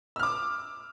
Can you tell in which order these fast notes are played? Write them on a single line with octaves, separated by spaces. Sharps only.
E6 F6 D6